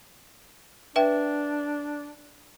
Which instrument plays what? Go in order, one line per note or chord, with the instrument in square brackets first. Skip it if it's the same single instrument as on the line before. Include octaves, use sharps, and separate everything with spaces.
[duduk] D4 [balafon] B4 E5 G5